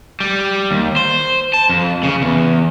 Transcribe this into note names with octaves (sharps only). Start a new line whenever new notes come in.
G3
D#2
C5
A5
F2
C#3
E2